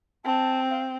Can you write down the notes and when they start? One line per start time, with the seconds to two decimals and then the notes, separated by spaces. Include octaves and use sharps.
0.25 C4 A5
0.70 F5